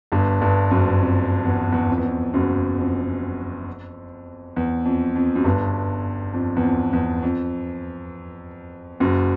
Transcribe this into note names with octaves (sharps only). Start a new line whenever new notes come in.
G1 G2
G1 G2
F#1 F#2
F2
E2
E2
F2
E2
F2
F#1 F#2
F2
E2
F2
F2
F#2
G1 G2
F2
E2
F2
E2
F2
F#1 F#2